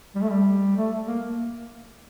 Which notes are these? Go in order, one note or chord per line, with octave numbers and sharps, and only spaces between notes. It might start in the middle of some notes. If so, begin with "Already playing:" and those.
G3
A3
G3
A3
A#3